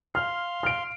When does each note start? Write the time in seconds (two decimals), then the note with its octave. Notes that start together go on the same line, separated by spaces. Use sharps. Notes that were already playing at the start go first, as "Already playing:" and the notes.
0.15 F5 C6 F6
0.63 F6 D7